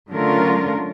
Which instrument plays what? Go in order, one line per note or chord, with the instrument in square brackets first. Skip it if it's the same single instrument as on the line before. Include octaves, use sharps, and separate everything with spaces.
[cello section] D3 F#3 A3 C#4 F4 A#4